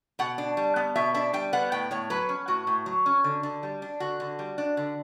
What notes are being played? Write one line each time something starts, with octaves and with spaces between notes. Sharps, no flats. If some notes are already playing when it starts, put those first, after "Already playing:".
B2 F#5
D4
G3
B3
B2 E5
D4 E5
G3 G5
B3 F#5
A2 G5
A2 C#5
F#3 B4
C#4
A2 F#4
A2
F#3
C#4
D3
D3
G3
D4
D3 F#4
D3
G3
D4
D3